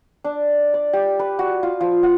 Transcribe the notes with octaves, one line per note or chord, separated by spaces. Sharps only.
D4
D5
G4
B4
F#4
F4
F3
F#5